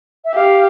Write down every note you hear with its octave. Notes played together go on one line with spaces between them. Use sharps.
E5
G4 F5